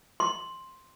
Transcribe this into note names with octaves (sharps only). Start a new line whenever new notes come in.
C6